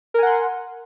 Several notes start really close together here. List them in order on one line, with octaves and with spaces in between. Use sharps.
A#4 G#5 F#5 C6